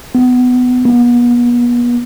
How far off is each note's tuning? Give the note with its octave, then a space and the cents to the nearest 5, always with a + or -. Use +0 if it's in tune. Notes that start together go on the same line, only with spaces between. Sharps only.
B3 +15
B3 -40